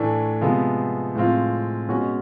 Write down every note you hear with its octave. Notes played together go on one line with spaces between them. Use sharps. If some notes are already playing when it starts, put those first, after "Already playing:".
Already playing: A2 E3 A3 D4
C3 F3 G#3 B3
A2 F3 G#3 C4 F4
B2 G#3 C#4 F#4